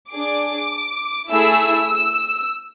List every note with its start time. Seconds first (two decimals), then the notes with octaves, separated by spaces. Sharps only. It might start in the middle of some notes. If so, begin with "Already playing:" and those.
0.12 D4 G#4 D6
1.31 A3 E4 G#4 E6
1.90 E6